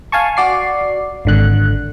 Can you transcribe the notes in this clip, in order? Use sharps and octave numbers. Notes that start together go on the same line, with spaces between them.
F5 G#5 A5 C#6
F#4 D5 C7
G#1 D3 F#6